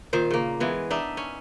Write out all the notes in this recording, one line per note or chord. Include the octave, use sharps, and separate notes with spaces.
A#2 D#3 C5
C#3 A#3
E3 G#3 B3
D4 D#4 E5
C#4